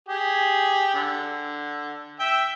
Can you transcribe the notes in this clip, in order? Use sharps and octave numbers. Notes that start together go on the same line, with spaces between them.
G4 G#4
D3
E5 G5